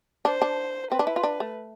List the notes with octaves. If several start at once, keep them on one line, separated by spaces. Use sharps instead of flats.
D4 C5
D4
C4 B4
D4
E4
F4
D4
A3